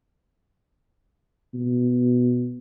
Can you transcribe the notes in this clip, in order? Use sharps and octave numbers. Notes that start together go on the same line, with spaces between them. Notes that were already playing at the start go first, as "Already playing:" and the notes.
B2